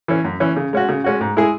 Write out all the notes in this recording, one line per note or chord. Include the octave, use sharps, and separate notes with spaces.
E3 C#4
F#2
E3 C#4
C#3
G#3 C#4 F#4
C#3
G#3 C#4 F#4
G#2
G#3 E4 G#4